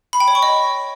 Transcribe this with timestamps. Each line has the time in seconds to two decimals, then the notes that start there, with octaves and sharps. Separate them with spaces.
0.13 B5
0.20 G5
0.28 C#5
0.35 C#6
0.43 D#5